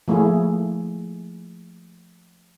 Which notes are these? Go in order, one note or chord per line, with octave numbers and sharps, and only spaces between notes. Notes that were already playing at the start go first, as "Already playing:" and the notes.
F3 A3 A#3 E4 G#4